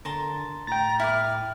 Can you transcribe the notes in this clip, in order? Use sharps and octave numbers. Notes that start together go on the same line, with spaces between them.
D3 A#4 A5 C6
A2 G5 A#5 A6
E4 B4 D6 F6